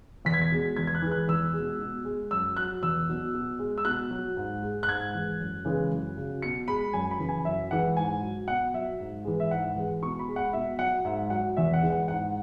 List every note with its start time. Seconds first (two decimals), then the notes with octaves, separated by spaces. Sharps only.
0.25 E2 B6
0.34 G#6
0.42 B6
0.52 B2 G#3
0.77 E2 G#6
0.87 G#6
0.95 F#6
1.02 E3 G#3
1.11 F#6
1.28 E2 E6
1.53 G#3
1.58 B2
1.79 B2
2.05 G#3
2.31 F#2 E6
2.57 F#3 F#6
2.82 E2 E6
3.09 B2 F#3
3.34 B2
3.59 G#3
3.78 E6
3.85 B2 F#6
4.10 F#3
4.37 G#2
4.63 G#3
4.83 F#6
4.88 G#2 G#6
5.14 E3 G#3
5.40 F#2
5.65 C#3 E3 G#3
5.91 F#2
6.17 C#3 F#3
6.42 B2 C#7
6.68 G#3 B5
6.93 F#2 G#5
7.11 B5
7.19 C#3 E3
7.29 G#5
7.45 F#2 E5
7.71 E3 G#3 F#5
7.97 G#2 G#5
8.23 F#3
8.47 B2 F#5
8.74 F#3 E5
9.00 G#2
9.25 E3 G#3
9.40 E5
9.51 G#2 F#5
9.76 E3 G#3
10.03 B2 C#6
10.19 B5
10.28 G#3
10.36 F#5
10.53 B2 E5
10.79 F#3 F#5
11.05 G#2 E5
11.30 F#3 F#5
11.57 E2 E5
11.73 F#5
11.82 E3 G#3
11.90 F#5
12.08 G#2 F#5